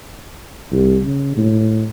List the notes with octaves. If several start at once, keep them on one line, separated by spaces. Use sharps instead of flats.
C2
C#3
A2